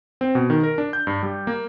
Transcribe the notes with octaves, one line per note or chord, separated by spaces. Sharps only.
C4
B2
D#3
A#4
D4
G6
G2
G3
A#3